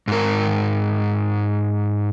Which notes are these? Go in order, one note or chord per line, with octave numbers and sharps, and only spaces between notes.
G#2 A#4